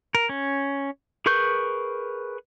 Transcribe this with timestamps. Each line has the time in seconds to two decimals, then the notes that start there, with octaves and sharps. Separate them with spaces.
0.15 A#4
0.29 C#4
1.26 G#4 A#4 B4 C#6 G6